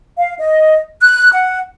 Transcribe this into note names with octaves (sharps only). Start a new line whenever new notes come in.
F5
D#5
F#6
F#5